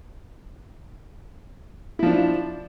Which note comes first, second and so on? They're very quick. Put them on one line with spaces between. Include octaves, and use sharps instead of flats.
E4 F3 D4